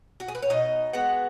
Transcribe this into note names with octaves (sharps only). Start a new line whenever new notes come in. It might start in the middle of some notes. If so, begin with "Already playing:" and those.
F#4
G#4
B4
C#5
B2 D#4 D#5
G#3 B3 F#4 F#5